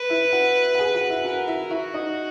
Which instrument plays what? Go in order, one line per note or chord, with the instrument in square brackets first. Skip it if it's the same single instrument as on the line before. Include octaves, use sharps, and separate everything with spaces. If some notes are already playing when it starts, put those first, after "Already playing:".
Already playing: [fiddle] B4
[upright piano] E4 E5
F#4 F#5
F#5
G#4 G#5
F#4 F#5
E4 E5
[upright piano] F#4 F#5 [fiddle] A#4
[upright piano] E4 E5
[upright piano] E4 E5 [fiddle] F#4
[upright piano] D#4 D#5